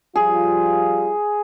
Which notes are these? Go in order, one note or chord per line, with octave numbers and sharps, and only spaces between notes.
F3 G3 F4 G#4